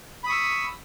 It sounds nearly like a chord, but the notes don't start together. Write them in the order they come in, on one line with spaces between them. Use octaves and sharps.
B5 D#6 C#6 E6